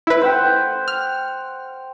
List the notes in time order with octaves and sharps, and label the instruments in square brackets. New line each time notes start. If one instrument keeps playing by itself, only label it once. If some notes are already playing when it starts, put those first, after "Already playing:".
[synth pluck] E4 B4
[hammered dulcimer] C5 F#5 G5
[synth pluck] F6